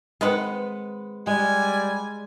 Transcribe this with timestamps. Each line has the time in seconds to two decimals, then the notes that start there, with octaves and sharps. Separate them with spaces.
0.21 D#3 G#3 C4 B4 F#5
1.27 G3 G#3 G#5